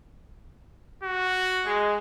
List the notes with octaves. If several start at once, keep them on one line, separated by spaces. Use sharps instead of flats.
F#4
G#3